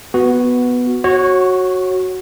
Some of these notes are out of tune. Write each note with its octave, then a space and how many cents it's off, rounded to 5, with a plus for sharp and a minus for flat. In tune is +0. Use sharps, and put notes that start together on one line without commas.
B3 +0 F#4 -5
F#4 +0 C#5 -25